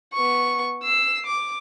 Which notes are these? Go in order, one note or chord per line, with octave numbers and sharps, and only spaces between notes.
B3 C#6
E6 C7
D6